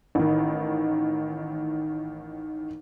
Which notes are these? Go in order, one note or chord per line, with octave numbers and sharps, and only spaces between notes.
A1 D#3